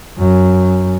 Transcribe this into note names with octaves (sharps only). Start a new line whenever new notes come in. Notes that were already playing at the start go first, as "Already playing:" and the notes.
F#2